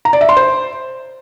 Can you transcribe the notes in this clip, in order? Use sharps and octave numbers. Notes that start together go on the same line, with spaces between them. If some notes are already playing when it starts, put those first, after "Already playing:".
A#5
D5
E5
C6
C5